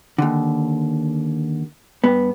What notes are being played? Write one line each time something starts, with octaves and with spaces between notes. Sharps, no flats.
D#2 D3
G2 B3